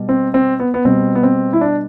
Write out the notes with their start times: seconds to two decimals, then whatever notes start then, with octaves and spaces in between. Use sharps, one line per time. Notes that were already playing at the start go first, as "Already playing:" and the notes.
Already playing: B2 G3
0.09 C4
0.34 C4
0.60 B3
0.74 B3
0.85 B2 G3 C4
1.15 B3
1.23 C4
1.53 E4
1.61 D4